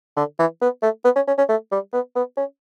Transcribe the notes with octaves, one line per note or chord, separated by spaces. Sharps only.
D3
E3
B3
A3
B3
C#4
C#4
C#4
A3
G3
B3
B3
C#4